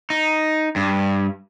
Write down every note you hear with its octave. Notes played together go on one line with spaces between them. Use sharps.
D#4
G2